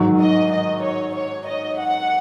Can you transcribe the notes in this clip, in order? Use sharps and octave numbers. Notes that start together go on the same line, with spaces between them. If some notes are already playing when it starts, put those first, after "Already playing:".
Already playing: G#2 D#3 F#3
D#5
D#5
C#5
C#5
D#5
F#5